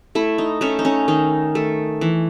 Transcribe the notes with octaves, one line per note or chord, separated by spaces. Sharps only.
A3 E4
D#4
A3 C#4
D#4
C#4
D#3 D#4
A3
E3